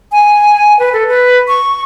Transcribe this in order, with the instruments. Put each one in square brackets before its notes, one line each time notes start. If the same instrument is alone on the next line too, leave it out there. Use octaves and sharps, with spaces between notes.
[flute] G#5
B4
A4
B4
C#6